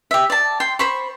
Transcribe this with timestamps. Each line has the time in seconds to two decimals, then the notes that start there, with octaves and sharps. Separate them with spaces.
0.11 G4 E5
0.30 D5 A5
0.60 G5 C6
0.79 C5 B5 C#6